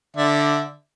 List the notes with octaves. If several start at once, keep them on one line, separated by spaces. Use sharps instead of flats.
D3 D5 E5